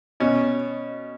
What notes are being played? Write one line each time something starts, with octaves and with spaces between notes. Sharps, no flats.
B2 C#4